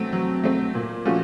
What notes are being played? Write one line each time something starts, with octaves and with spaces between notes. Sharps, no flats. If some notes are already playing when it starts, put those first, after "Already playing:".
Already playing: F#3 A3 C4
F#3
A3 C4
A#2
F3 A3 C#4 F#4